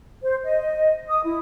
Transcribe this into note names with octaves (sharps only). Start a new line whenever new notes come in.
C5
D#5
D#6
E4